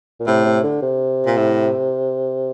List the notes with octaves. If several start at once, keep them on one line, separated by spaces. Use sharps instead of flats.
A#2
A2 C3
C3
D3
C3
A#2
A2